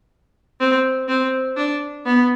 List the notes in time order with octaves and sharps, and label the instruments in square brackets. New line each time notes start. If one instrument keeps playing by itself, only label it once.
[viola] C4
C4
D4
B3